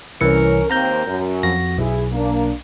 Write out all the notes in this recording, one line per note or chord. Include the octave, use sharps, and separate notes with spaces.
C2 E3 C#4 A#4 C#7
D#2 A#3 C4 A#4 A#5 G6
F#2
F2 F#4 A#6
B1 E4 G#4
A#3 D4